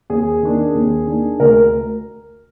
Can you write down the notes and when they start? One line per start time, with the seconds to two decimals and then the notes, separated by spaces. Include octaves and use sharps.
0.10 D#2 G#4
0.42 D#3 A#3 D4
0.75 D#2
1.07 D#3 A#3 D4
1.39 D2 A#4